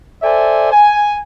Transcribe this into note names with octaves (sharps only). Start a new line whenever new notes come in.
A4 C5 D5 E5 G#5
G#5